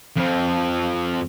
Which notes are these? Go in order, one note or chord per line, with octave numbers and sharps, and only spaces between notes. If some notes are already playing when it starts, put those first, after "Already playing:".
F2 F3